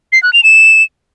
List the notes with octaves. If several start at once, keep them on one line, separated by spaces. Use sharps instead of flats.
C7
F#6
F7
E7